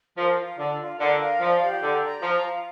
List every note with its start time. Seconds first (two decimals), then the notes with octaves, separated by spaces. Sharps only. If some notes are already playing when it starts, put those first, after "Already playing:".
0.18 F3 A#4
0.39 F4
0.58 D3 D5
0.80 F4
1.00 D3 A#4
1.20 F5
1.40 F3 D5
1.62 G4
1.82 D3 D5
2.02 A#5
2.22 F3 F5
2.44 F4